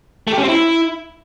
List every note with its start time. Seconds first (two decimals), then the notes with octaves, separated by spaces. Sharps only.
0.27 A3
0.33 G4
0.38 C#4
0.43 C4
0.48 E4